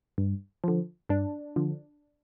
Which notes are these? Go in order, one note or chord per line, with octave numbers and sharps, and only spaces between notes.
G2
D3 F3
G2 D4
D3 F3